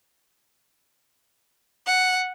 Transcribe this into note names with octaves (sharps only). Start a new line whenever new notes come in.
F#5